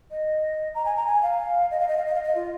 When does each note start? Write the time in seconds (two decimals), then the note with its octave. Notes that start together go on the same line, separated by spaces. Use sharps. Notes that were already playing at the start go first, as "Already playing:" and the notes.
0.11 D#5
0.75 A#5
0.85 G#5
0.96 A#5
1.07 G#5
1.23 F5
1.71 D#5
1.80 F5
1.89 D#5
1.97 F5
2.06 D#5
2.15 F5
2.23 D#5
2.35 F4